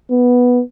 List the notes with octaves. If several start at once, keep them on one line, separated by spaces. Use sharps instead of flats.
B3